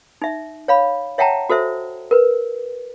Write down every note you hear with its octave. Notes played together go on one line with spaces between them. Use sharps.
D#4 E5
C#5 F5 B5
C#5 E5 F#5 G5 A5 A#5
F#4 A4 C5 E5
A#4 B4